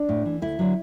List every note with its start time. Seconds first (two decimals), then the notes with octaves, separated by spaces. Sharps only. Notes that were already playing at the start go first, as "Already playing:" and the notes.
Already playing: D4
0.09 A2
0.26 E3
0.42 D2 E4
0.59 D3 F#3